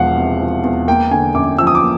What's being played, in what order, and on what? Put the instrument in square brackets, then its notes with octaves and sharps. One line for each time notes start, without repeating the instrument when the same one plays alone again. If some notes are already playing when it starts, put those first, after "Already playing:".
Already playing: [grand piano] E1 E2 F3 F5 F#5
C3
F3
E2
A#3 G5
D3 G#5
F#2 D6
F3 E6
D#6
D6
A#3